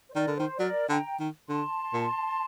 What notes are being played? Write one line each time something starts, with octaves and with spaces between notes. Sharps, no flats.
C5
D#3 A#4 D5
D3
D#3 C5
F#3 A#4 D5
D3 G5 A#5
D#3
D3 A5 C6
A#2